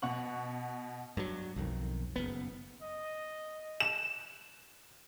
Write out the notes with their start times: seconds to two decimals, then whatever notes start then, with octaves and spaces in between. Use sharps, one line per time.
0.02 B2 F#5 C#6 F#7
1.17 G2 F#3
1.56 B1 F2 D#3
2.16 F#1 B3
2.82 D#5
3.80 E7